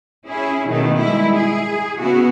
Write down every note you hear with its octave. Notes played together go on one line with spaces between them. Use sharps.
C#4 E4 G#4
B2 D#3 A3
G3 G#3 E4
G#4
C#3 B3 E4 F#4